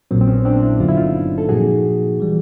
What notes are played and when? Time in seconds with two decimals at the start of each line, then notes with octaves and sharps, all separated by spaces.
0.11 A#1 A#2 F#3 A#3 C4
0.21 C4
0.28 B3 C#4
0.45 C4 D4
0.62 D4 E4
0.80 G1 G2 D3 F#3 F4
0.89 E4
0.97 D#4 F4
1.38 A4
1.48 A#2 F3 A#3 D#4 F#4 G#4
2.20 E3 G3